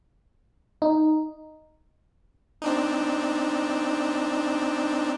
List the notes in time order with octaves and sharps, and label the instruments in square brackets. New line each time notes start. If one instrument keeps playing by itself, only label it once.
[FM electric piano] D#4
[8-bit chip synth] C4 D4 D#4